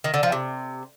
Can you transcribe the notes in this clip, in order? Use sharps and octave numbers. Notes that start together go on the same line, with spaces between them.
D#3
D3
F3
C3